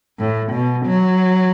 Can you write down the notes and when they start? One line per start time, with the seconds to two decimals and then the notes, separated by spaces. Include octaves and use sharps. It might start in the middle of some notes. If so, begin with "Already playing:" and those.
0.19 A2
0.52 B2
0.86 F#3